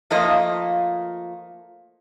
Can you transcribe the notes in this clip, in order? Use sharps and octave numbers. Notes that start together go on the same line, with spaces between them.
F3 A3 A#3 F4 D#5